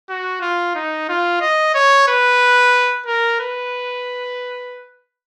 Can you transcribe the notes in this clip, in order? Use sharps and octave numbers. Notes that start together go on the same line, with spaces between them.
F#4
F4
D#4
F4
D#5
C#5
B4
A#4
B4